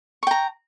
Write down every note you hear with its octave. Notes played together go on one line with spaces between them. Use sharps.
G5 A#5 C#6